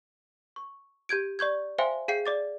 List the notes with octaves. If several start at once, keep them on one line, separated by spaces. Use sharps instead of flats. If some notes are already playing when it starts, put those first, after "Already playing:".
C#6
G4 G6 G#6 D7
D5 C#6 G6 G#6
C5 E5 F5 G5 G#5 C6
G#4 F5 G5 G6 C7
D5 D6 A6